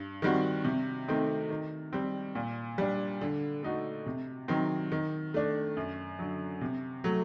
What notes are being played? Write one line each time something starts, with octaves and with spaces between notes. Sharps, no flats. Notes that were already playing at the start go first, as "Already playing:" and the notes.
Already playing: G2
D#3 G3 C4 F#4
C3
D#3 A3 C4 D#4
D#3
G3 C4
A#2
G3 D4
D3
A3 D#4 F#4
C3
D#3 F#3 C4
D#3
A3 D4
F#2
D3 F#3
C3
F#3 A3